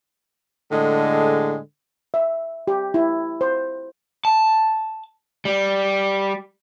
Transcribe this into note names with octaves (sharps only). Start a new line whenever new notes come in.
A2 D3 G#3
E5
G4
E4
C5
A5
G3